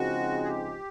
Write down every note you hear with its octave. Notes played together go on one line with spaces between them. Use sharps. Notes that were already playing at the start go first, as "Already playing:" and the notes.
Already playing: C#3 F3 G#3 C4 D#4 F#4
G#4
G4